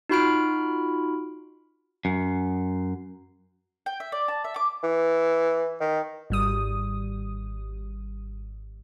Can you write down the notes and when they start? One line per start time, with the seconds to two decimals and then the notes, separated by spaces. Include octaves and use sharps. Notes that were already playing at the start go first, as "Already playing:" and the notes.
0.09 D#4 F4 F#4 B5 F6 D7
2.05 F#2
3.86 G5
4.00 E5
4.12 D5
4.28 A5
4.44 E5
4.56 D6
4.83 E3
5.81 D#3
6.30 G#1 G3 D#6